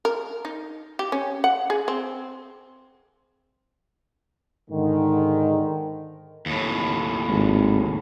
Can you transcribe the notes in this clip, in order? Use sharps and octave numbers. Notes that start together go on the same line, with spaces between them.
A#4
D#4
G4
C#4
F#5
G#4
C4
G#2 D3 D#3
D#2 A2
G#1